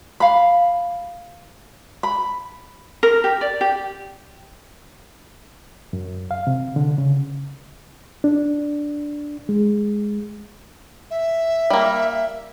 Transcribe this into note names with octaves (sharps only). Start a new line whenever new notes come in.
F5 B5
B5
A#4
G4
D5
G4
F#2
F5
C3
D3
C#3
D4
G#3
E5
G3 A#3